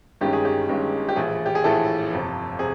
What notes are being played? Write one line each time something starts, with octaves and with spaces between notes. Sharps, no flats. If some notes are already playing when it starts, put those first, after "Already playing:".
G1 G2 D#3 G#3 C#4 G4
G#4
G4
G1 G2 D#3 G#3 C#4
G4
A#1 A2 E3 A3 G#4
G4
G#4
A#1 A2 E3 A3 A4
G1 F2 C3
C3 G#4